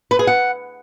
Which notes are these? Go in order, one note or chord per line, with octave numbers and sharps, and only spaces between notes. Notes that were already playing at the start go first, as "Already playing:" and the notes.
B4
G#4
F#5